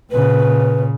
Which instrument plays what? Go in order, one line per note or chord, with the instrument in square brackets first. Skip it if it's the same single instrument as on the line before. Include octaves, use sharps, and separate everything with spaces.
[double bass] A#2 C#3 [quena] B4